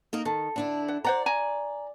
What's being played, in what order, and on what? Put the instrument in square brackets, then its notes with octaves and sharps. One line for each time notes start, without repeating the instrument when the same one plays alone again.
[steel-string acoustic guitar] A#3 D#4 A#4
[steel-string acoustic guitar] D#3 [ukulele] A4
[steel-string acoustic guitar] D3 D4 E4
[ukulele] F#5
[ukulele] C5 F#5 A#5 [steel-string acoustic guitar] D5
[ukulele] G#5 A#5